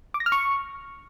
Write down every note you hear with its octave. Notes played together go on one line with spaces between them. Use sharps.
D6
A#6
F6
C#6